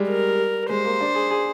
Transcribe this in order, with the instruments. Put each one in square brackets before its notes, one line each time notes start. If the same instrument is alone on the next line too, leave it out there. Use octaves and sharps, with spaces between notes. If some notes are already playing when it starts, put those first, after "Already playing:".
Already playing: [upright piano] G3 G#3
[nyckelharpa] A#4
[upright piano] G#3 [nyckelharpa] C5
[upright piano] A#3
D4
G#4
G#4